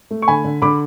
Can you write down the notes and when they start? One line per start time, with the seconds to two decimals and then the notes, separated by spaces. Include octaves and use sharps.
0.11 A3
0.22 C#6
0.28 D3 G#5 B5
0.45 D3
0.62 D3 B5 D6